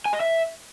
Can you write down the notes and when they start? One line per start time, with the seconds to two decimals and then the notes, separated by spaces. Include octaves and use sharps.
0.06 G#5
0.13 D#5
0.20 E5